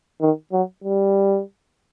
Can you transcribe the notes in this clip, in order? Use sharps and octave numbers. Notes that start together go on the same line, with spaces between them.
D#3
F#3
G3